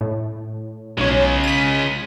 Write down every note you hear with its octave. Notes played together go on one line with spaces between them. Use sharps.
A2
B1 C#3 G#3 C#5
B6 D#7